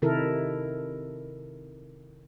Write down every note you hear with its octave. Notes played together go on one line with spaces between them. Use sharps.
C3 D#3 E4 A4 A#4